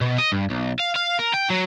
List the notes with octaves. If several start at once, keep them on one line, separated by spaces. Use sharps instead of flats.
B2
D#5
G2
B1
F5
F5
A#4
G5
F#3